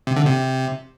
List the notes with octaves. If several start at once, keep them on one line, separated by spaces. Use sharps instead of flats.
C3
D3
C3